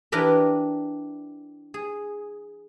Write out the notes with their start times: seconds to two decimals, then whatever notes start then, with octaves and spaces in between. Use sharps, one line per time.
0.12 E3 D4 G4 A#4 B4
1.74 G#4